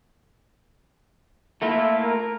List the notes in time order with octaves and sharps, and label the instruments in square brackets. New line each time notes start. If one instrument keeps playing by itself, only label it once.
[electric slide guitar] A3 A#3 F4 [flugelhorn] E4
[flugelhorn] A#4